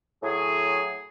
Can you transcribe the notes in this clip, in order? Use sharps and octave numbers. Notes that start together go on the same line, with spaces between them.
A2 F#3 G#4